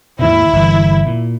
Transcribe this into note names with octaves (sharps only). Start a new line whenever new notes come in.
D#2 G#2 B2 E4
G1 E3
A#2